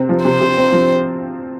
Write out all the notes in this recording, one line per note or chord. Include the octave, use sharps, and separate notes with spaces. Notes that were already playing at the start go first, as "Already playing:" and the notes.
Already playing: C3 C4
F3
C3 C5
C3
C4
F3